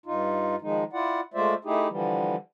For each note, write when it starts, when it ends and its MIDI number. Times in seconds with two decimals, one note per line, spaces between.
0.06 0.56 43
0.06 0.56 63
0.06 0.56 65
0.61 0.84 51
0.61 0.84 53
0.61 0.84 56
0.61 0.84 63
0.93 1.20 64
0.93 1.20 65
0.93 1.20 74
0.93 1.20 78
1.34 1.54 56
1.34 1.54 57
1.34 1.54 65
1.34 1.54 72
1.34 1.54 74
1.34 1.54 76
1.65 1.88 57
1.65 1.88 63
1.65 1.88 64
1.65 1.88 67
1.65 1.88 68
1.89 2.36 50
1.89 2.36 52
1.89 2.36 53
1.89 2.36 55